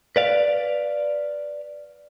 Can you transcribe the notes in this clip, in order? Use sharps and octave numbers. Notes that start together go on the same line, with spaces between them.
B4 D5 F5